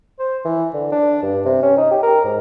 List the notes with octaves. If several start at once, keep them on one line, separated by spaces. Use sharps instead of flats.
C5
E3
D3
D4
G2
C3
C#4
D#4
G4
A#4
G#2